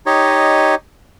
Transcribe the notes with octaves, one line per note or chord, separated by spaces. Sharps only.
D#4 G4 C#5 D#5